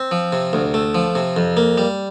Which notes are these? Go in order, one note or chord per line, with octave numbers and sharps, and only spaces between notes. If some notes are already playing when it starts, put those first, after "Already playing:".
Already playing: C4
F3
C3
D2
A3
F3
C3
F2
A#3
G3